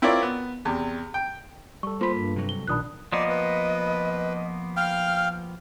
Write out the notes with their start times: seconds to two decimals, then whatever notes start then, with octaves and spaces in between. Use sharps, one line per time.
0.02 C4 E4 F4 A#4 C#5 D5
0.23 B3
0.65 E2 C3
1.14 G5
1.83 G3 A4 C#6
2.01 A#3 F4 C5 B5
2.14 G2
2.36 C3 F#3
2.49 G7
2.68 B1 A#2 D#3 D4 B5 D#6 F#6
3.12 F3 A#3 B3 D5 D#5
3.29 B4
4.77 F5 G5 F6